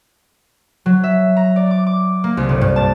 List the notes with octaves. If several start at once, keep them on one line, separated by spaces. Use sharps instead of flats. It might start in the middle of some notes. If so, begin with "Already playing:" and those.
F#3
E5
A#5
D5
D6
D6
A#3
C2
G1
G2
A5